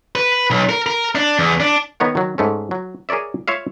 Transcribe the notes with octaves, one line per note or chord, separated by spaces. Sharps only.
B4
B1
A#4
A#4
D4
E2
D4
D#3 B3 D#4 C#5 F#5
D#3 F#3
G#2 A3 C#4
F#3
G#4 A#4 C#5 D5 E5
F4 C#5 E5 F5